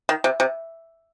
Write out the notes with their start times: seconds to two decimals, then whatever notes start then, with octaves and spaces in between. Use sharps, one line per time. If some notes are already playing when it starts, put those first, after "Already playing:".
0.09 D#3
0.24 C3
0.40 C3